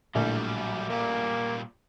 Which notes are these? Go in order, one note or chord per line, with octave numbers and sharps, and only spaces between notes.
A#1 A2 F#3 G3
A#2 G3 A#3